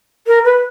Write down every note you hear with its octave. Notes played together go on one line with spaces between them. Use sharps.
A#4
B4